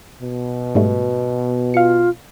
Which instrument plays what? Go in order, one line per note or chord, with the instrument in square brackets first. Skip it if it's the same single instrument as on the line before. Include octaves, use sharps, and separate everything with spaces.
[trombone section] B2
[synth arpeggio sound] G#2 G3 A3
[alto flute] F4 [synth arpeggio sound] F5 C#7